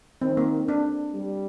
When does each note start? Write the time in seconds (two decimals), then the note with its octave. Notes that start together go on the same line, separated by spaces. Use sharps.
0.22 D#3 C4
0.37 A#3
0.68 D4
1.14 G3